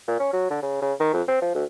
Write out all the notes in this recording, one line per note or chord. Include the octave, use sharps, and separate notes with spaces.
A#2
C#4
F#3
D3
C#3
C#3
D#3
F2
C4
F3
D2